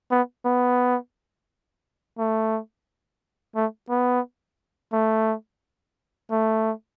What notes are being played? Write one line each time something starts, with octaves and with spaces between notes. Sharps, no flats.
B3
B3
A3
A3
B3
A3
A3